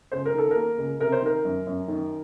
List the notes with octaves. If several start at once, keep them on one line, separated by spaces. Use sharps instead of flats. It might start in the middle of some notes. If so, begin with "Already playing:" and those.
C#2 C5
A#4
D#3 A4
A#3 A#4
C#2
C3 A#4
C5
D#3 A#4
F#2
F#2
D#3